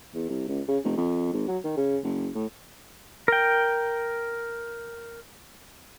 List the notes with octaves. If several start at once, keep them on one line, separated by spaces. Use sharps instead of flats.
E2
C2
C#2
C#3
F1
F2
G#1
F#3
D#3
C#3
F#1
A2
A#4 G5